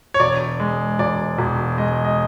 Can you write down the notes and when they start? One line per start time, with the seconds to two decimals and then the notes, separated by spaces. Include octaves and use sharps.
0.14 C#5
0.20 E1 D5
0.60 G#3
0.99 E1 D5
1.38 E1
1.78 G#3 D#5
2.05 D#5